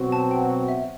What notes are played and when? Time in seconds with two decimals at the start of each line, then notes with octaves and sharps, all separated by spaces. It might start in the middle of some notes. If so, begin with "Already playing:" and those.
Already playing: B2 F#3 C4 F#4
0.12 A5
0.31 G5
0.50 F#5
0.68 E5